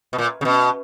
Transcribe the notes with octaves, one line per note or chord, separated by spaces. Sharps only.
B2
A#2
C#3
B2